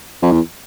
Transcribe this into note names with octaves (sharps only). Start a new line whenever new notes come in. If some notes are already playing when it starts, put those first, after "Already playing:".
F2
E2